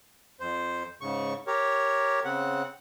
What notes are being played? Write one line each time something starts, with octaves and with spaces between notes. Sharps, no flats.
F2 C5
G#2 C#3 C#6
G4 A#4 C#5
C#3 C4 F#5